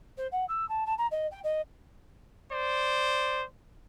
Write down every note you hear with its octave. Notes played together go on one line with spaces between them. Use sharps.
C5
F#5
E6
A5
A5
A#5
D#5
G5
D#5
C5 D5